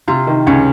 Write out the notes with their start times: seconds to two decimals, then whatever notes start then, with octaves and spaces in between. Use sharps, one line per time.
0.08 C3 F4
0.27 D#3
0.47 C#2 C#4